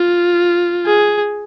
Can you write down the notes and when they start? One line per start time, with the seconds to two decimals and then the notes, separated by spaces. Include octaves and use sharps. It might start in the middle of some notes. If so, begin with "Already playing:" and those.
Already playing: F4
0.86 G#4